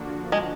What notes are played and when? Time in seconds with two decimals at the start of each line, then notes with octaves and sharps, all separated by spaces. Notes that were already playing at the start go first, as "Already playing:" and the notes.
Already playing: D3 F3 A#3 D4 F#4
0.32 G#3